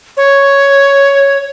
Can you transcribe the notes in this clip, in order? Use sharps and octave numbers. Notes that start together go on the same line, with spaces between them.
C#5